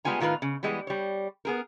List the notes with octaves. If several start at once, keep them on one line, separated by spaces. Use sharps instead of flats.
G3 G#3 B3 F4 G#5 A#5
A2 D#3 F4 B4 F5
C#3
E3 G3 G#3 B3
G3 C#5
B3 G#4 A#4